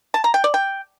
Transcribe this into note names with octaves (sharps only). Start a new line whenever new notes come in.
A5
A#5
G5
D5
G5